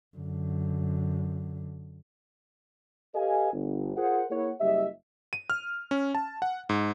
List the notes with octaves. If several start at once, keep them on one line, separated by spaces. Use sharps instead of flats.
F#2 D3
G4 A4 B4 D#5 F5 G#5
G1
F4 G#4 A#4 C5 F#5
A#3 E4 G#4 A#4 C#5 F#5
F#1 G3 G4 D#5 E5
D#7
F6
C#4
A5
F#5
G#2